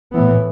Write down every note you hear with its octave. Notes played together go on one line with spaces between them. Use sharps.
A2 E3 B3